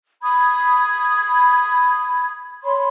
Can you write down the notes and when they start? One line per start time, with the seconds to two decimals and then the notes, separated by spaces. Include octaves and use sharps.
0.23 B5 D#6 G#6
2.64 C#5 B5 C6